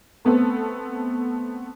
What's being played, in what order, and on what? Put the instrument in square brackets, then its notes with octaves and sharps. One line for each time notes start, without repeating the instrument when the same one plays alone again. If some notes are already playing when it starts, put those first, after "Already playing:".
[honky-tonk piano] A3 B3 C4 A4